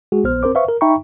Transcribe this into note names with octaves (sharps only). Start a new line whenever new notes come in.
G#3 F#4 G#4
A#1 B3 C5 F6
C4 A#4 C5 D6
B4 C5 E5 F5 C#6
A#4
D#4 E5 G5 A#5 B5 C#6